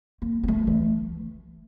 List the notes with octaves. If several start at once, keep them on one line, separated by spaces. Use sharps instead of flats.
A#3
A#3
A3
E3